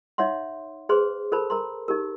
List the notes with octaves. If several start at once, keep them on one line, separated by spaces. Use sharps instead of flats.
D#4 C#5 E5 F#5 C6
G#4 B4 C5 C6
A4 A#4 C5 A5 B5
A#4 A#5 C6
D#4 G4 A#4